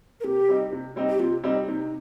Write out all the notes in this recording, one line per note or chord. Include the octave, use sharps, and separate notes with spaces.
A#4
C3 G4
G3 C4 D#4
C3
G3 C4 D#4
G4
C3 F4
G3 C4 D#4
C3 D#4